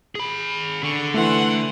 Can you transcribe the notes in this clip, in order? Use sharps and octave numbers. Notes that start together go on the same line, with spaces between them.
G#4 B5
D3 C#6
E3 A3 F#5 C6